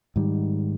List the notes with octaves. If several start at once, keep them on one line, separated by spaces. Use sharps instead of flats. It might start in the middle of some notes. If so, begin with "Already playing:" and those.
G#2 D#3 G3